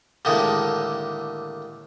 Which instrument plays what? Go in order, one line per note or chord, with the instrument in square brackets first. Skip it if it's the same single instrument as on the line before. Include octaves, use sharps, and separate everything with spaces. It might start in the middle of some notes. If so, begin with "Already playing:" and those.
[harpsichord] D#2 A2 D3 G#3